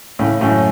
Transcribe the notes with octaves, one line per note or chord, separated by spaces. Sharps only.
A2 C#3
F#2 A2